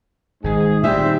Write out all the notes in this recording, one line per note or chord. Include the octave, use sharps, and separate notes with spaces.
G#1 G#2 D#3 G#4
A#2 D#3 G3 C4 D#4 G4 E5